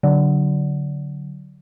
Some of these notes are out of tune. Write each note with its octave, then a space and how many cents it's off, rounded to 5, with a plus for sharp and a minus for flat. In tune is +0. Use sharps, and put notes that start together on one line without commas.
D3 -25 F#3 +0